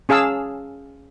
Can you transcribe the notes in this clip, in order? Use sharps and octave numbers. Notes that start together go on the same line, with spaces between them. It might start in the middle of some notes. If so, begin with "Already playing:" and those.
C#4 G#4 F5 A5 E6